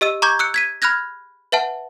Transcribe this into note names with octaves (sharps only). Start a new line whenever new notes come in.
G4 D#5 E6 D#7
A#5 C#6 D6 G6 G#6
E6 F#6 C#7
G#6 B6 D#7
B5 F6 F#6 G#6 A#6
B4 E5 F#5 A5